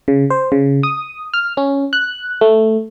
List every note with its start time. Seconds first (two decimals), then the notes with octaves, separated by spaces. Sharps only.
0.08 C#3
0.30 C5
0.52 C#3
0.83 D#6
1.34 F6
1.57 C#4
1.93 F#6
2.41 A3